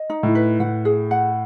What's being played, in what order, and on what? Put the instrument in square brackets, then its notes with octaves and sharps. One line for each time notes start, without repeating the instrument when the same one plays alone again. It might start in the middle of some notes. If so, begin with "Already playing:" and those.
Already playing: [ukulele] D#5
D#4
[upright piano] A2
[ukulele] B4
[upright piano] A2 [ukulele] F#5
[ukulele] G#4
F#5